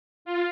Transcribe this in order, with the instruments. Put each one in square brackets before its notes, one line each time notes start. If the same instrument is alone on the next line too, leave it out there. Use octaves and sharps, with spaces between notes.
[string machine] F4